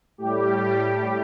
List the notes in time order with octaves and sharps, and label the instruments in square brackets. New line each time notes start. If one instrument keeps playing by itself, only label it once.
[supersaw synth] A2 G3 G4